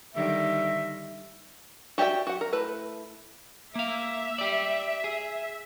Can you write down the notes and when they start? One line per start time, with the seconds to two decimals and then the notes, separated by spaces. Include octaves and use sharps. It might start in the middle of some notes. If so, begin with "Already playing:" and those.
0.14 D3 D#3 G3 E5
1.98 F#4 G4 D5 E5 G5
2.27 F#4 F#5
2.41 A#4
2.52 A3 E4 B4
3.75 A#3 E5 F5
4.38 G4 D5
5.04 G#4